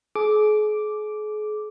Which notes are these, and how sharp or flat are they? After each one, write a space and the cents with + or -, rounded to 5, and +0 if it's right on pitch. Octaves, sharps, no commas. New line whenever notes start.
G#4 +40 D6 +0